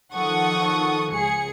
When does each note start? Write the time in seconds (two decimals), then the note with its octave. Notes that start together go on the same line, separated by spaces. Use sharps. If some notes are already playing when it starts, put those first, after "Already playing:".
0.13 D#3 F3 A4 F#5 C#6 D#6
1.12 C#2 G#4 C#7